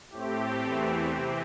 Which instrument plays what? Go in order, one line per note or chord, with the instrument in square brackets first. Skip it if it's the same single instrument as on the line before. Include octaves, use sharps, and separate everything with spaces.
[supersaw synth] A2 A3 C4 G4
E2 E3 A3 C4
C3 E3 C4